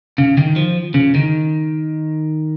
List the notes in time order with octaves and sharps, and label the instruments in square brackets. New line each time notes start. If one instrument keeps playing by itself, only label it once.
[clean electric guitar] C#3
D#3
F3
C#3
D#3